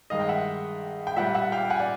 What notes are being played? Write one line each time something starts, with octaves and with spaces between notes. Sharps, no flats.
G2 D#3 G#3 D#5 F5
G5
E5 F#5
G5
A#2 G3 E5 F#5
E5 F#5
F5 G5
F#5 G#5
D5